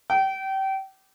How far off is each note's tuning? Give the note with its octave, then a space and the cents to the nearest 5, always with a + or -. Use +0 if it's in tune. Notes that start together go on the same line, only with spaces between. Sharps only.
G5 -30